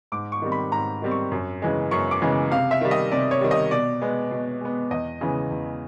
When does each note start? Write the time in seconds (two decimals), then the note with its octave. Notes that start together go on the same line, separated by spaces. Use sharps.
0.12 G#2 D6
0.32 C#6
0.42 D#3 G3 C4
0.52 B5
0.72 G#2 A#5
1.02 D#3 G3 C4
1.11 C#6
1.32 F#2
1.62 C#3 E3 G#3
1.91 F#2 C#6
2.11 D6
2.22 C#3 E3 G#3
2.51 C3 F5
2.71 E5
2.81 D#3 G3
2.91 D#5
3.12 C3 D5
3.31 C#5
3.41 D#3 G3
3.51 D#5
3.71 B2 D5
4.01 G#3 B3
4.31 B2
4.61 G#3 B3
4.91 E2 D#5
5.21 C#3 E3 G#3
5.51 E2